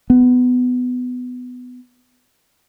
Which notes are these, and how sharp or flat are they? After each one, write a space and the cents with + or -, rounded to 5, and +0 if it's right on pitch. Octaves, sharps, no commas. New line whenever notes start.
B3 +15